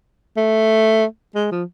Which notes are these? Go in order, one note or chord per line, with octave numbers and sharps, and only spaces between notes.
A3
G#3
F3